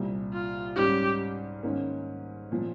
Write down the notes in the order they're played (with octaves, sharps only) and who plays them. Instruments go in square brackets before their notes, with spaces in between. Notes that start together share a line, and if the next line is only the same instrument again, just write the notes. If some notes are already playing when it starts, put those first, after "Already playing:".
Already playing: [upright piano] C2 A#2 G3
[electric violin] F4
[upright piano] G#2 G3 C#4 [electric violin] G4
[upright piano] G#2 D#3 A#3 C#4
A#2 F3